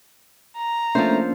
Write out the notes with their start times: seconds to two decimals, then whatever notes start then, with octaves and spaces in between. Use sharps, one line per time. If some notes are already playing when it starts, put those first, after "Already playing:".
0.57 A#5
0.95 F3 A3 A#3 C#4 D4 A4 C5